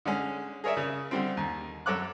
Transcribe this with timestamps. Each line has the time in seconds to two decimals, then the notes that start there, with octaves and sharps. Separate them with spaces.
0.05 D3 G#3 C#4
0.64 G#4 A#4 C#5 D5 E5
0.77 C#3
1.11 D3 G3 C4
1.37 D#2
1.86 F#2 A4 C#5 D6 F#6